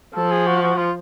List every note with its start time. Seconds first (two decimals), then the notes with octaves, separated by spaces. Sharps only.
0.16 F3 A4
0.31 G#4
0.47 F#4
0.62 F#4
0.78 F4